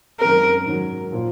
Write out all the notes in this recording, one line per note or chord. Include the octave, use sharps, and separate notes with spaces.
F#2 D#3 G#3 C4 A#4
G#2 D#3 F#3
A#2 F3 A#3 F4